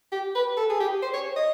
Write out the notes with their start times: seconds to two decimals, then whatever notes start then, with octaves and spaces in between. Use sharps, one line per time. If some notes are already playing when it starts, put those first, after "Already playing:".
0.12 G4
0.35 B4
0.57 A4
0.70 G#4
0.80 G4
1.02 C5
1.14 C#5
1.36 D#5